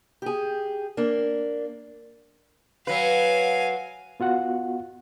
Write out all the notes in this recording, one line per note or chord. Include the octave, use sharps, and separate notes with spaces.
G4 G#4
A#3 D4
F#3 B4 F5 G#5
B3 F4 F#4 F#5